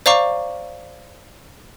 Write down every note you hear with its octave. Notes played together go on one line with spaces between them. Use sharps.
C5 D5 F5 A#5 C#6 D6